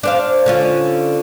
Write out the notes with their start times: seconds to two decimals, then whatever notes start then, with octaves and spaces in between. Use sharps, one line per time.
0.03 D4 C5 F5
0.46 D3 C#4 F4